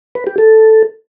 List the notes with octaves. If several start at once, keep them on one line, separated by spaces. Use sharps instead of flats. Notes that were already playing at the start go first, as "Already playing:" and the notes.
B4
G4
A4